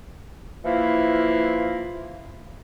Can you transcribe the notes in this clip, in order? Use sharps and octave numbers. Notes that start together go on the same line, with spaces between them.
E3 F3 A#3 E4 F4